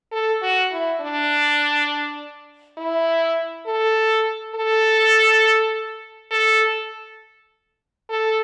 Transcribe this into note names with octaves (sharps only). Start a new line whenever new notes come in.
A4
F#4
E4
D4
E4
A4
A4
A4
A4